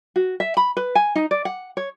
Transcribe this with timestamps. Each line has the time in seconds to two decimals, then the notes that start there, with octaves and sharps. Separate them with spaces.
0.16 F#4
0.40 E5
0.57 B5
0.77 B4
0.95 G#5
1.15 D#4
1.31 D5
1.45 F#5
1.77 C#5